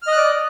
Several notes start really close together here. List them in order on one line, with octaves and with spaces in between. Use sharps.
F6 D#5 F#6 D5